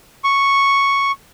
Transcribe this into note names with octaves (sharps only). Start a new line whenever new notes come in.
C#6